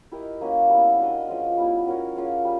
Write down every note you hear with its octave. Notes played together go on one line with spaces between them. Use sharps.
E4 G4 A#4 D#5
A#3 C#4 F#4
G3 B3 E4
D4 F#4 A#4 D#5
F3 G#3 C#4
G3 B3 E4
C#4 F#4 A#4 C#5
C#4 F4 G#4 C#5
G3